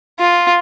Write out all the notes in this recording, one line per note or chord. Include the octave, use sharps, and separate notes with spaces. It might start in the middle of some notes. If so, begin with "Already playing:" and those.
F4